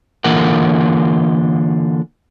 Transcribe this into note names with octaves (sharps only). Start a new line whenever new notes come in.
D3 E3 A#3 F4 A#4 F#5